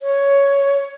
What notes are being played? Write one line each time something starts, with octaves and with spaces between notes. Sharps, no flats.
C#5